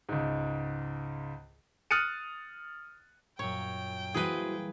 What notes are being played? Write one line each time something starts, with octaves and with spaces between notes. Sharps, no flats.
C#2 G#2
D#6 F6 F#6 A6 C#7 D#7
F#2 A#2 C#5 G5
E3 G3 A#3 E4 F#4 G#4 B4 C5